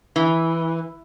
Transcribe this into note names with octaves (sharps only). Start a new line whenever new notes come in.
E3